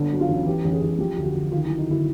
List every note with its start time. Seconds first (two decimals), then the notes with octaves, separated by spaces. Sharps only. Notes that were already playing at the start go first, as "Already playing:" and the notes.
Already playing: G1 D3
0.11 F#3
0.21 F4
0.29 A1
0.46 E3 G4
0.65 A1
0.73 G#4
0.81 A1
0.99 F3 G4
1.17 D2
1.25 F#4
1.34 D2
1.51 D#3 F4
1.65 E4
1.69 F#3
1.78 D#4
1.87 G1 E4